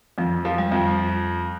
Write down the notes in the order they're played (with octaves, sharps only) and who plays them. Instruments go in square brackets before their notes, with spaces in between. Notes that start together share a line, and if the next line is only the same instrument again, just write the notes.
[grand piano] F2 [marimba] F3
[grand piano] F3
[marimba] G3
[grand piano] F2